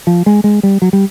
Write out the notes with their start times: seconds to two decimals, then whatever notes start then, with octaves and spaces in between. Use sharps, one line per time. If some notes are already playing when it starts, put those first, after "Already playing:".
0.07 F3
0.26 G#3
0.44 G#3
0.63 G3
0.82 F#3
0.93 G3